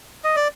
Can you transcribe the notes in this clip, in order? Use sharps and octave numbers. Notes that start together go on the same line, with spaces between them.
D#5
D5